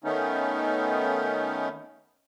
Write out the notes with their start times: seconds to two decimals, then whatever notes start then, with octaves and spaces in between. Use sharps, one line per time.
0.04 D#3 A3 B3 C#4 D#4